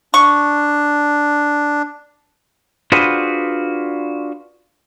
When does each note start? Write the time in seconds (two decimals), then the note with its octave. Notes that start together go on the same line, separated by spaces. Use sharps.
0.14 D4 C#6
2.92 D4 F4 F#4 G#4 B4 C5